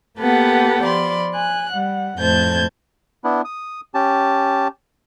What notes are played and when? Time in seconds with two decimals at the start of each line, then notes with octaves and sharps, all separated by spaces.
0.18 A#3 B3 G4 A4 B4 F#5
0.83 F3 D5 B5 C6
1.33 G#5 F#6
1.72 G3 F#5
2.18 F2 A2 C5 A5 G6 G#6
3.24 B3 D4 E4
3.45 D#6
3.94 C#4 G4 A5